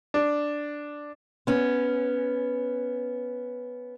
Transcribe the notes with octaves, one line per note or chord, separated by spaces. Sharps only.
D4
B3 C#4